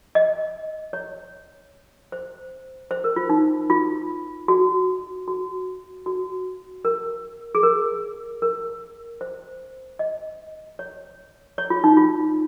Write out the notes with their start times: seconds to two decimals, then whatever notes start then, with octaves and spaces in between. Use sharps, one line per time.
0.15 D#5
0.93 C#5
2.12 C5
2.91 C5
3.04 A#4
3.16 F4
3.29 D#4
3.70 F4
4.48 F#4
5.28 F#4
6.06 F#4
6.85 A#4
7.55 G#4
7.63 A#4
8.42 A#4
9.21 C5
9.99 D#5
10.79 C#5
11.58 C#5
11.70 F4
11.84 D#4
11.97 F4